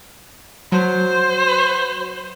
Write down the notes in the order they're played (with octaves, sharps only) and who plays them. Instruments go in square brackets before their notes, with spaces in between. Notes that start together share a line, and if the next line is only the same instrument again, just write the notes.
[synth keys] F#3 [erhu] C5